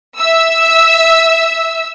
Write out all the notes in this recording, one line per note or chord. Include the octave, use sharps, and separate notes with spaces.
E5 E6